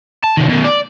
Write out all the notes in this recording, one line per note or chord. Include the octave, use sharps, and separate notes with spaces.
A5
C3 D#3
B2 D#3
D5